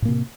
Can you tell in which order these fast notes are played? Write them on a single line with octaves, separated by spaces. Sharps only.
A2 A#3 C3